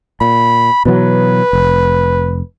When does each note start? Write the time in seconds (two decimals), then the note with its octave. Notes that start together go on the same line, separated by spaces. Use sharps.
0.21 A#2 B5
0.86 B2 E3 F#3 B4
1.53 F1